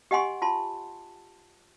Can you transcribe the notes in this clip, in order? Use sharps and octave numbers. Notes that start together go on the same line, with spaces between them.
G4 D#5 F#5 G#5 C6 C#6
F4 A5 C6